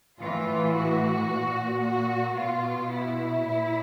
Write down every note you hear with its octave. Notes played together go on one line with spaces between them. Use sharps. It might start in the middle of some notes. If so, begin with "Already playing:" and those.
A2 E3 F4
F#4
A#2
F#4
B2 F4
E4
A#2